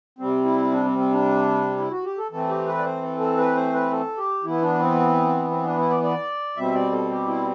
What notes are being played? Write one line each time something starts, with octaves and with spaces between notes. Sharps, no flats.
C3 G3 C4
E4
D4
C4
C4
D4
E4
F#4
G4
A4
E3 A3 C4 A4
G4
B4
D5
C5
A4
A4
B4
C5
B4
A4
G4
E3 B3 E4
D4
C4
C4
D4
E4
D5
D5
B2 G3 C4 E5
D5
A4
G4
E4